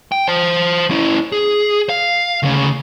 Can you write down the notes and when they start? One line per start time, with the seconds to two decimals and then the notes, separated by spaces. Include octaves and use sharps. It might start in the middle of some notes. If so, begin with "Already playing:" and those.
0.12 G5
0.28 C5 A5
0.91 C#4 E4
1.32 G#4
1.89 F5
2.43 D2 C#3